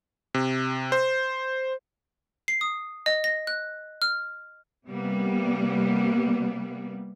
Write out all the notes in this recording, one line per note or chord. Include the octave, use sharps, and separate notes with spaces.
C3
C5
C7
D#6
D#5
A#6
F#6
F6
C3 G3 A#3 B3